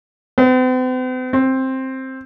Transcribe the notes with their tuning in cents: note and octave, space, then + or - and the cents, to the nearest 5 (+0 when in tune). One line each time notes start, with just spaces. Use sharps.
C4 -45
C4 +10